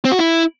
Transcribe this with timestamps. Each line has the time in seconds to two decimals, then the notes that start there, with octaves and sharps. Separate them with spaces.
0.05 C4
0.12 F#4
0.18 E4